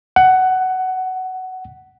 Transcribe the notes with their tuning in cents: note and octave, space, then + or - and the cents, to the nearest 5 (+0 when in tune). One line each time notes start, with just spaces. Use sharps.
F#5 +15